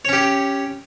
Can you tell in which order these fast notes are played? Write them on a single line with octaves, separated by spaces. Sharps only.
C#5 C#4 G4